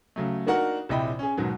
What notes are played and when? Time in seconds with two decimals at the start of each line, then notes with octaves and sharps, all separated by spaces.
0.16 C#3 F#3 A3
0.47 A#3 D4 D#4 F#4 A#4 F#5
0.89 A#1 C3 E4 D#5 G5 B5
1.19 C#4 G#4
1.37 G#2 B2 D#3 F#3